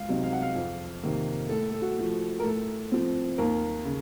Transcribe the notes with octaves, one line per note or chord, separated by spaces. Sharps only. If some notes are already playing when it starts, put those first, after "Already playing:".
Already playing: C#2 F5
C3 F#3 C4 D#4
F5
F#5
F5
F2
C3 D#3 A#3
A2 A4
A4
F#4
F3 A3
A#4
A2 A4
F3 C4
D#2 A#4
C#3